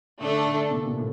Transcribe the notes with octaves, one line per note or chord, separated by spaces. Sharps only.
D3 A3 D4 A4
D3
C3
A#2
C3
A2